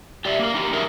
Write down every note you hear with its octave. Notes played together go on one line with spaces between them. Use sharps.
G4 D5 E5
A#3 A#4
D#4 G4
A3 C#4 E4 F#4 G#4 A#4